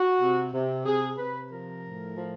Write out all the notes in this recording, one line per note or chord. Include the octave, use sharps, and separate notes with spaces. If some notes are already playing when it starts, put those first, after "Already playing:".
Already playing: F#4
C3
C3
C3 G#4
C3 B4
F3 A#4
A2
F3